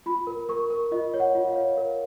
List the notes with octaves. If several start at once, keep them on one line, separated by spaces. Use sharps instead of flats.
F4 B5
A#4
A#4 C#6
A#4
F4 D#5
C#5
F#5
F4
F5
C#5
A#4 F5